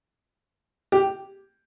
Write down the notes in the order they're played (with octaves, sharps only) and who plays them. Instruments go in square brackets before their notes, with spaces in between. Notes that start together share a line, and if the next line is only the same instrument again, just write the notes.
[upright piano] G4